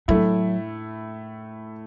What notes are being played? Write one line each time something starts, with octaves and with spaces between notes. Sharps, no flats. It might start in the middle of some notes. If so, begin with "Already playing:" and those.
A2 F#3 A3 E4